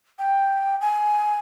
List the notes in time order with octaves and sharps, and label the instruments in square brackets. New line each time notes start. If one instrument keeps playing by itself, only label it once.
[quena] G5
G#5